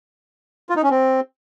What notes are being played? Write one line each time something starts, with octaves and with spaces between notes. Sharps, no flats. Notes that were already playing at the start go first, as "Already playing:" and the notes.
F4
D#4
C#4
C4